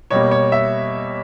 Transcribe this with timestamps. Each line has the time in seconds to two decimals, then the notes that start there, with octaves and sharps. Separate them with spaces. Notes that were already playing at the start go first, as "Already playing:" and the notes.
0.11 B2 G3 A#3 C#5
0.31 C#5
0.52 E5